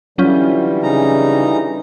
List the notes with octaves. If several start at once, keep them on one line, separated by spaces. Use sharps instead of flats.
D3 E3 F#3 G3 C#4 F4
C#3 D#4 A#5